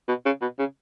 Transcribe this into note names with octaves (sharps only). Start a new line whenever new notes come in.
B2
C#3
B2
C#3